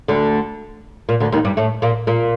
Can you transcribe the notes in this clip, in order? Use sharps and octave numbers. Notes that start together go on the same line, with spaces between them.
D2 D3
A#2
D2 D3
D#2 D#3
G2 G3
A2 A3
A#2 A#3
A#2 A#3